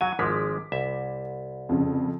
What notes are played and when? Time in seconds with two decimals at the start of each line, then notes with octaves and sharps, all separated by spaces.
0.01 F#3 F#5 G#5
0.19 G#1 F3 G#3 D6 B6
0.72 C2 E5
1.69 F2 C#3